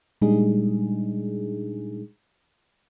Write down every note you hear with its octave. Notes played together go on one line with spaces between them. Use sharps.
A#2 G3 G#3 D4 D#4 G#4